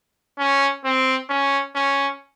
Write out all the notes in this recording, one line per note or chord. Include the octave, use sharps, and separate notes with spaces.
C#4
C4
C#4
C#4